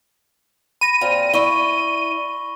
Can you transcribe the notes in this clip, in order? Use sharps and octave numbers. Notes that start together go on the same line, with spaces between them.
B5 A#6 D#7
A#2 C4 F4
E4 D5 B5 C#6 G7